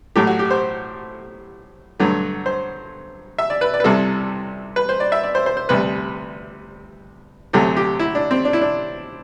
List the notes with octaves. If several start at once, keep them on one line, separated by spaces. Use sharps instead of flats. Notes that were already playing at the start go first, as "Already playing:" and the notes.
A2 F#3 A3 G4
F#4
G4
C5
G2 D3 F#3 A3
C5
E5
D5
B4
D5
B4
C2 C3 G3 A4
B4
C5
D5
E5
D5
C5
C5
C5
D2 C3 G3 B4
D2 C3 F#3 A3 G4
G4
E4
D4
C4
D4
E4
D4